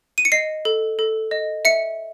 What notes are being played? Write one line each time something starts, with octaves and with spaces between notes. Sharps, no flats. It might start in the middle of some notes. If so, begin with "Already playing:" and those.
D#7
C#7
D#5 C7
A4
A4
D#5
E5 C#7